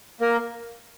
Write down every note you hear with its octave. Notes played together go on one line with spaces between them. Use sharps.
A#3 A#4